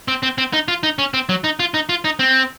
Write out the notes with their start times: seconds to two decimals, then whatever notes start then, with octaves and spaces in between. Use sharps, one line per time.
0.08 C4
0.23 C4
0.38 C4
0.53 D#4
0.68 F4
0.83 D#4
0.99 C#4
1.14 C4
1.29 F#3
1.44 D#4
1.60 F4
1.74 D#4
1.89 F4
2.04 D#4
2.19 C4